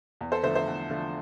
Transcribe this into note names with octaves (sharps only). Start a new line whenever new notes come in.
E2
A4 C5
D3 F3 A3 C5 E5
C5 E5
E2
D3 F3 A3